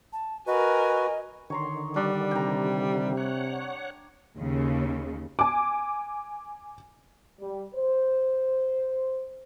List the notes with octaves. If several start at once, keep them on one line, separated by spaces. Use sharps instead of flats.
A5
F#4 A#4 B4 D#5 G#5
D3 D#3 C#5 A#5 C6
G3 D4
C3 G5 A#5
C#5 F#5
D#2 C#3
G#5 D6
G3
C5